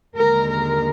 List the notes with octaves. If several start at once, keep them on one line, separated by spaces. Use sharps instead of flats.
D#2 D3 G#3 A#4
A#4